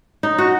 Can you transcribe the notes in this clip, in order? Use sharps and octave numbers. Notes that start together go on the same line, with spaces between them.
D#4
F#4